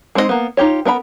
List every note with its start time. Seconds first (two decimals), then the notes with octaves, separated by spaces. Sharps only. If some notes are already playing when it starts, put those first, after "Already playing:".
0.15 G#3 C4 D#4 F#4 D#5
0.29 A#3 B3
0.57 D#4 F4 G4 C#5
0.85 B3 A#4 E5 B5